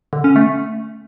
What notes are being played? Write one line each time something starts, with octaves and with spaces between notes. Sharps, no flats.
D3
C#4
A3